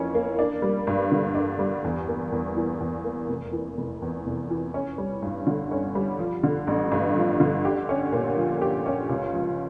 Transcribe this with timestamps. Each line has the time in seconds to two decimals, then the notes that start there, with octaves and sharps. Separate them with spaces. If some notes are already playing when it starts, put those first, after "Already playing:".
Already playing: F2 E3 A#3 C#4
0.15 A#3
0.39 D4
0.62 G3
0.87 G2
1.12 D3
1.35 D4
1.59 G3
1.84 E2
2.08 A#3
2.32 E2
2.56 E3
2.80 E2
3.04 A#3
3.29 F1
3.52 E3
3.77 F1
4.02 E2
4.26 F1
4.50 E3
4.74 C#4
4.98 G3
5.22 G2
5.47 D3
5.71 C#4
5.95 G3
6.19 F3
6.43 D3
6.67 A1
6.92 G2
7.16 F3
7.40 D3
7.65 G4
7.89 C#4
8.12 A#2
8.37 F3
8.62 G4
8.86 C#4
9.09 C#2
9.34 F3